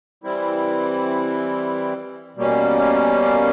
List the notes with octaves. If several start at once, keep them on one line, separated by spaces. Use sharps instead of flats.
E3 G3 C4 E4
B2 G3 A#3 C#4